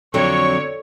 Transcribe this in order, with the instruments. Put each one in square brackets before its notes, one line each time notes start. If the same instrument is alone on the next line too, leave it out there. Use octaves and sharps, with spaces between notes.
[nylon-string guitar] F2 F#3 C4 [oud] D3 [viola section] C#5 [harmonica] C#6